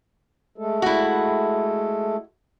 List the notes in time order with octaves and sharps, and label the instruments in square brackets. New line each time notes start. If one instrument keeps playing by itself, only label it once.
[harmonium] G#3 A3 A4
[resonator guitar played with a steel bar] E4 F#4